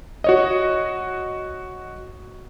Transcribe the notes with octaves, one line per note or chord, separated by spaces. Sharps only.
F#4 C#5 D#5